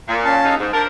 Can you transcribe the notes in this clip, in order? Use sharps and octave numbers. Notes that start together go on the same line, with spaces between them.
A#2
C#4 F5 A5
D#2 C#3 D#4
G#2
F3 D4 A#4 A5